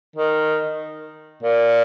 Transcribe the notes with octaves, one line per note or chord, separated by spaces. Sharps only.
D#3
A#2